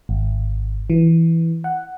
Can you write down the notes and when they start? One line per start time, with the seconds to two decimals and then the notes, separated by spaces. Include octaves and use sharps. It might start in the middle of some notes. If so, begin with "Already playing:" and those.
0.09 G#1
0.90 E3
1.64 F#5